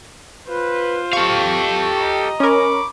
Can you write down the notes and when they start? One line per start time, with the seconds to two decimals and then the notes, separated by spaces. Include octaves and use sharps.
0.49 F4 B4 C5
1.13 G4 A4 F5 C#6
1.96 D#5 A#5
2.40 C#4 A#4 B5 C#6 D6